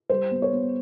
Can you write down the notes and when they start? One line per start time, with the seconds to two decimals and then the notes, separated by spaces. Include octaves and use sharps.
0.09 G3 C5
0.31 B3
0.42 C#5
0.53 B3